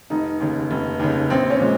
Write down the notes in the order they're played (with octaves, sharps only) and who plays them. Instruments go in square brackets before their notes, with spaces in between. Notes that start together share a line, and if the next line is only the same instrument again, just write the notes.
[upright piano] F1 D#4
D#2 C#3
F1
D#2 C#3
A#1 C4
C#4
A#2 F3 G#3